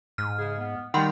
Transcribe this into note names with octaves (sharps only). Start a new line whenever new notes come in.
G#2 F6
C#3 G#4
B3
D#3 G3 F#5 G5 B5 C6